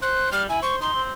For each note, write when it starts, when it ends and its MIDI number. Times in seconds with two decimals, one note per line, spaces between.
0.02 0.31 72
0.02 0.29 90
0.32 0.49 55
0.32 0.43 89
0.49 0.62 64
0.49 0.59 80
0.62 0.79 72
0.62 0.76 85
0.81 0.90 63
0.81 1.01 84
0.94 1.13 60